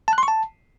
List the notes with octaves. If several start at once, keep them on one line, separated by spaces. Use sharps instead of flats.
A5
F#6
C6
C#6
A5